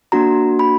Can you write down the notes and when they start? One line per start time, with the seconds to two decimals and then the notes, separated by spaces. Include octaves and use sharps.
0.12 A#3 D4 F#4 A#5
0.59 B5